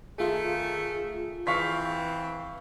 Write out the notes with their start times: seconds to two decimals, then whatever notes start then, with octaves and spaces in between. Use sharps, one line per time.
0.18 D#3 A3 F4 G#4
1.47 E3 C4 F5 C#6 B6